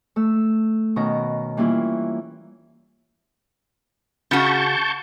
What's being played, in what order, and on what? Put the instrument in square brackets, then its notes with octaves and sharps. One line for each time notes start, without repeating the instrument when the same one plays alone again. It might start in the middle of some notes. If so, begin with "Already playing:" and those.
[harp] A3 E6
B2 D#3 B3 C#4 A#5
E3 G3 A#3 C#4 E4 F4
[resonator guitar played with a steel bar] C#3 F#4 [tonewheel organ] A5 C#6 G6